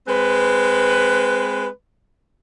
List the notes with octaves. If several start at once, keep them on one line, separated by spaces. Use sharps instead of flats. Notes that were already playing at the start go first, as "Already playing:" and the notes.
G#3 C4 B4